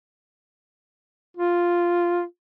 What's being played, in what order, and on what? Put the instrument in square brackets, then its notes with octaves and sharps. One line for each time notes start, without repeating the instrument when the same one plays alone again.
[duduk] F4